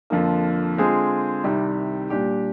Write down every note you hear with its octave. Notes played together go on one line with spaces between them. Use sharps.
F2 D3 F3 A#3
D3 G#3 C4 F4 G#4
C2 C3 D#3 G3
A#2 G3 D4 G4